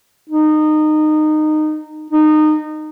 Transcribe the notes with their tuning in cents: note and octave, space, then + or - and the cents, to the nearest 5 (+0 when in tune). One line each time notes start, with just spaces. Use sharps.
D#4 -20
D#4 -25